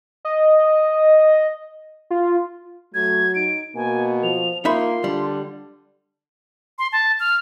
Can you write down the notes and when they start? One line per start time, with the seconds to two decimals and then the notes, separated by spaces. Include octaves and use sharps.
0.25 D#5
2.10 F4
2.94 F#3 A3 G#6
3.35 D#4 D7
3.75 B2 A#3 G#5
4.24 F3 F7
4.65 A#3 D#4 F4 E5 B5 C6
5.04 D3 G3
6.79 C6
6.92 A5
7.20 F6